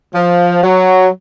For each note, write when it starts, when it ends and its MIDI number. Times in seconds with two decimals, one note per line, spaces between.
0.14 0.61 53
0.63 1.07 54